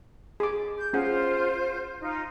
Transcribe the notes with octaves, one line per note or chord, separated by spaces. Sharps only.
G#4 D6
G6
C#4 F4 G#4 C5 F#5
D#4 F4